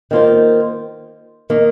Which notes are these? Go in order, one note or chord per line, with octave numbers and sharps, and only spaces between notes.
D#3 A#3 F4 C5
D#3 A#3